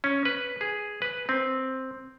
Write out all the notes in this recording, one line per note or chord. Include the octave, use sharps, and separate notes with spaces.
C#4
B4
G#4
B4
C4